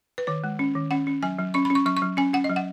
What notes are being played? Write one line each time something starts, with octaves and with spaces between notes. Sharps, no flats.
B4
D#3 C#5
G#3
C#4
D#3
C#4 F#5
C#4
F#3 G#5
F#3
C#4 C#6
B5
C#4
C#6
F#3 C#6
C#6
F#3
C#4 G#5
C#4 F#5
D#5
F#3
F#5